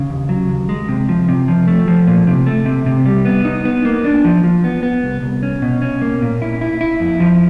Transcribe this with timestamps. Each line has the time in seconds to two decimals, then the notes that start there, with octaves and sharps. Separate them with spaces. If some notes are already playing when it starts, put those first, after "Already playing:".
Already playing: C#3
0.10 D#2
0.29 F#3
0.49 D#2
0.69 G#3
0.89 C3
1.09 F3
1.29 C3
1.48 F3
1.68 A3
1.88 F3
2.07 A#2
2.27 C3
2.46 A3
2.66 C3
2.86 C3
3.06 G3
3.25 B3
3.45 D#4
3.65 B3
3.85 A#3
4.05 D4
4.24 F3
4.44 F3
4.64 B3
4.83 B3
5.03 C2
5.23 C2
5.43 C#4
5.62 B2
5.82 C#4
6.01 A#3
6.22 A#2
6.42 E4
6.61 E4
6.81 E4
7.00 F2
7.20 F3